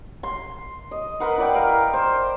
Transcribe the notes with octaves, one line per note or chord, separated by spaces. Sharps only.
C6
D#5
A#4 B4 F#5 C6
E4 D5 G5
A#4 F5
C5